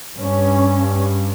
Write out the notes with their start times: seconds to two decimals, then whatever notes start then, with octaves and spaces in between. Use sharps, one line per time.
0.18 G2 C#4